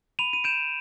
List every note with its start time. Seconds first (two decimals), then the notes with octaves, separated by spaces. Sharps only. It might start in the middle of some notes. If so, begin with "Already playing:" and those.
0.19 B5 D#7 F7
0.33 D#7
0.44 G6 D7 E7